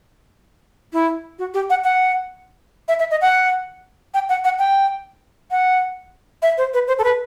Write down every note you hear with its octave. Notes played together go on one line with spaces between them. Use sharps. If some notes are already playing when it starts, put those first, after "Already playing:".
E4
F#4
G4
F#5
F#5
E5
E5
D#5
F#5
G5
F#5
F#5
G5
F#5
E5
C5
B4
C5
A4
B4